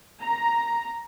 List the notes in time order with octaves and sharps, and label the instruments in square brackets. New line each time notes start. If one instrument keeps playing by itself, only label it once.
[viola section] A#5